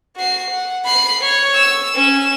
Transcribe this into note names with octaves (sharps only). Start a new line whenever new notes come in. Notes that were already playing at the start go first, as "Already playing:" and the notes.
F#4 C7
F#5
B5 C7
C#5
E6
C#4 E7